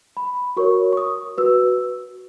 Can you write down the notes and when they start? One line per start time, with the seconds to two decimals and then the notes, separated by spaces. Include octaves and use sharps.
0.17 B5
0.57 F#4 A#4 C#5 C#6
0.93 C#6
0.97 D#6
1.38 F#4 B4 E6